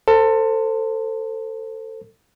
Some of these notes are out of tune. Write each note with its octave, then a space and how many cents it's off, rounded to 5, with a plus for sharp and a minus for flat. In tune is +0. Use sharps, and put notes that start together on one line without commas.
A4 +25 C5 +0